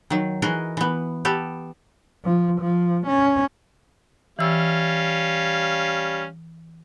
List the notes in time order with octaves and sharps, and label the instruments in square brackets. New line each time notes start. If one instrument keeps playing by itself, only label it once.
[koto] D#3 F#3
E3 F#4 G#4 A#4 D#5
E3 B3
B3 G4 A4
[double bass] F3
F3
C#4
[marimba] E3 E6 [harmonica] G3 C#4 F5